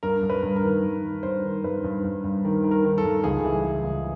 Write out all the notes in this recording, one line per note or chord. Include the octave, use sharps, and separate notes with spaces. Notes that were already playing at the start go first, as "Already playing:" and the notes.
G2 A#4
G2
B4
G2
A#4
D#3
G2
D#3
G2 C5
D#3
G2 B4
G2
G2
G2
D#3
D#3
A#4
D#3
A4
G2
C#2 G#4
E3
E3
C#2